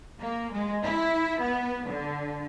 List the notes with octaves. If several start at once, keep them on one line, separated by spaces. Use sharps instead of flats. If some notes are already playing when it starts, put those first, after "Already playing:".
A#3
G#3
E4
B3
D3